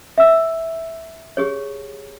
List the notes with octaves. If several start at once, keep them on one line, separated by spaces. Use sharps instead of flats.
E5 E6
G4 G#4 C#5